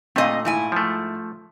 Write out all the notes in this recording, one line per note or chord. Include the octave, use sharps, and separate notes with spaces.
A#2 A3 C4 D#5 F5
G#2 E4 G#5
F3 A3